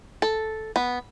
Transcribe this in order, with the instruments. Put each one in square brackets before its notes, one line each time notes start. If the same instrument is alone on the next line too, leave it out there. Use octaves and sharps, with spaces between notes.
[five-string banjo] A4
B3